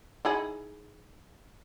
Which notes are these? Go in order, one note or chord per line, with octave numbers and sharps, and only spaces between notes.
D#4 E4 G#4